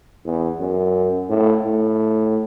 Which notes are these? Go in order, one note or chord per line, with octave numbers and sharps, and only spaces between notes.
E2
F#2
A2
A2